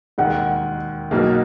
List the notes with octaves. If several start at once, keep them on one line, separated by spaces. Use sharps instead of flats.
E1 D#2 D#3 F#5
B1 B2 F#3 A#3 D#4